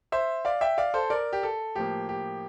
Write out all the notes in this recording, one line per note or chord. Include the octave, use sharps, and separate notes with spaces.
C5 E5
D5 F5
E5 G5
D5 F5
A4 C5
A#4 D5
G4
A4
A2 F3 A#3 G4
G4